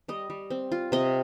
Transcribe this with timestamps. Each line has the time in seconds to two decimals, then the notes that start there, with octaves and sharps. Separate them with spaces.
0.08 G3 D#5
0.30 G3
0.50 C4
0.72 F4
0.92 C3 D#5